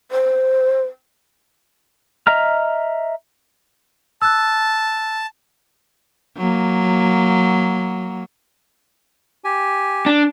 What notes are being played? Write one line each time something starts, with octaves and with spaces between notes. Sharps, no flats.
C5
D#5 E5 A#5 F6
A5 E6 F#6
F#3 A#3
G4 G#5
D4